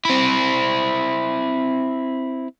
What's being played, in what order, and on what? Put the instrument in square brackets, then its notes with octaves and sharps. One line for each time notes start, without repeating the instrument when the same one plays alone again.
[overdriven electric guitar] C4 E4